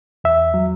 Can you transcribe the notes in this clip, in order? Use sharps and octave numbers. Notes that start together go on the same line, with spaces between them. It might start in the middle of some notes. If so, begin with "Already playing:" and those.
E2 E5
F#3